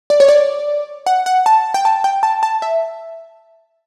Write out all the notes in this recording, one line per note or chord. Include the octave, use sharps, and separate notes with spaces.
D5
C#5
D5
F#5
F#5
A5
G5
A5
G5
A5
A5
E5